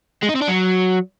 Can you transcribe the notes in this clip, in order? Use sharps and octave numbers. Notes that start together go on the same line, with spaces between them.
G#3
D#4
C4
D4
F#3